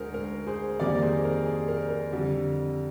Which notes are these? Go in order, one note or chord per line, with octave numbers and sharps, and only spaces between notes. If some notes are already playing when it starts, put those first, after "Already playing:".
Already playing: D2 D3 G#3 G#4 A#4 C5
A#4
G#4 C5
F2 D#3 G3 A#3 A#4 D5
G#4 C5
A#4
G#4
A#4
A#4
F2 D3 G3